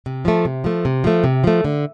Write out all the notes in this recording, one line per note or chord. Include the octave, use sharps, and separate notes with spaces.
C3
F3 A3
C3
F3 A3
C3
F3 A3
C3
F3 A3
D3